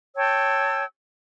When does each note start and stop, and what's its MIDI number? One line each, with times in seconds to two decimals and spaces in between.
0.16 0.84 73
0.16 0.84 79
0.16 0.84 81
0.16 0.84 88